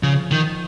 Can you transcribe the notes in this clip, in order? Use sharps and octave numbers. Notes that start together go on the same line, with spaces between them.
C#3 F3
D#3